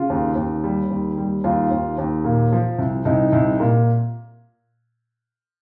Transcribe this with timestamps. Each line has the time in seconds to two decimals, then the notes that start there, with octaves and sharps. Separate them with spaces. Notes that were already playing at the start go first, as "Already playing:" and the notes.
Already playing: C#3 F4
0.10 D#2
0.36 D#2
0.64 G3
0.91 D#2
1.18 G3
1.44 D#2 F4
1.71 D#2
1.98 D#2
2.24 A#2
2.52 F3
2.78 C2
3.05 C2 D#4
3.32 C2
3.60 A#2